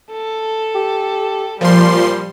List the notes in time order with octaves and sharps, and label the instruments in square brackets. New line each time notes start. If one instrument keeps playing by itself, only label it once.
[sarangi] A4
[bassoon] G4
[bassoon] A#2 [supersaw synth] F3 C6 [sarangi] G3